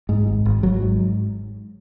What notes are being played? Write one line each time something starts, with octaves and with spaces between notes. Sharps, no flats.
G#2
G#1
G#1
G#1 F#3
G#2